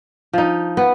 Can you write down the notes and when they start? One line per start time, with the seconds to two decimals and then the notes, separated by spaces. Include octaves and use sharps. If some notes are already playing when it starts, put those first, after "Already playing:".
0.33 F3 D#4
0.77 B3